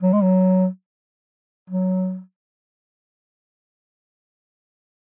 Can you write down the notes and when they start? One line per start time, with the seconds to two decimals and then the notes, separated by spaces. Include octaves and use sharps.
0.03 F#3
0.13 G#3
0.23 F#3
1.70 F#3